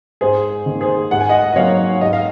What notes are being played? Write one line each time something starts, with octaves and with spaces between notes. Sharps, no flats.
G#2 G#4 C5
D#3 A#3
G#4 C5
G#2 F#5
G#5
D#5 F#5
D#5
F#3 A#3 D#4 C#5 F5
G#2 D#5
F5